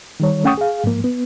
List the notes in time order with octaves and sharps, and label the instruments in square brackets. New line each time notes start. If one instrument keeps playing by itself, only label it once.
[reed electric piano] D#3 G3 C#5
A3 C#4 F#5 G5 C#6 D#6
G#4 F5
G#2 F3 A#3
B3